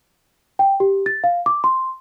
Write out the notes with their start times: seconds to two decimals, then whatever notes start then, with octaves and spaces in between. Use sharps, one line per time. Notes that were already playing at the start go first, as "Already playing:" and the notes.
0.59 G5
0.80 G4
1.06 A6
1.24 F5
1.46 D6
1.64 C6